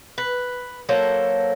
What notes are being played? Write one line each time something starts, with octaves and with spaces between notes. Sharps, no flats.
B4
F#3 A#3 A4 C5